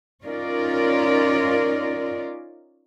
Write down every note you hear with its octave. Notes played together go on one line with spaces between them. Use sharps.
C#4 D#4 F4 A#4 D5